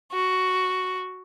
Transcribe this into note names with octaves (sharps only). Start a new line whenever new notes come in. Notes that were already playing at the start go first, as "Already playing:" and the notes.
F#4